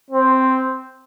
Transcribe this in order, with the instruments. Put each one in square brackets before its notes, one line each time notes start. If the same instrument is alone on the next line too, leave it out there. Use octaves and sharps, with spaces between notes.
[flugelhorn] C4